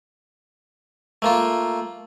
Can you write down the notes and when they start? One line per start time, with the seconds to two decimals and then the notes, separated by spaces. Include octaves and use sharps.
1.22 A3 A#3 F4